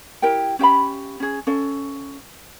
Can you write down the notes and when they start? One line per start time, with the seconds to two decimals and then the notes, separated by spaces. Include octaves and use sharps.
0.22 E4 G4 A#4 G5
0.59 C#4 G4 F5 B5
1.20 C#4 G#4
1.47 C#4 A4 F5